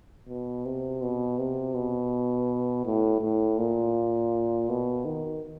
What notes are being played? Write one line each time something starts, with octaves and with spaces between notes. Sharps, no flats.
B2
C3
B2
C3
B2
A2
A2
A#2
B2
D#3